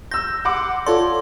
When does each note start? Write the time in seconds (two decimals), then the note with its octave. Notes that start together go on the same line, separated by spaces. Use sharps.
0.11 E6 G6 A#6
0.45 F#5 C6 D6
0.87 F4 A4 C#5 D5 C6